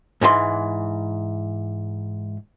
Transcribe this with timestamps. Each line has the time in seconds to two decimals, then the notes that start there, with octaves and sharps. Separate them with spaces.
0.21 G#2 E3 G#4 C6